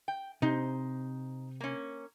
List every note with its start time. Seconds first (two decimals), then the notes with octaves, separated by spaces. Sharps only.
0.08 G5
0.42 C3 D#4 C5
1.61 A#3 C#4